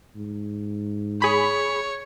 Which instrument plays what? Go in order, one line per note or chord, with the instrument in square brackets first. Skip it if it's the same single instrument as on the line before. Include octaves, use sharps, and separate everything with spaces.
[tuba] G#2
[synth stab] G#4 B5 [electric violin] C#5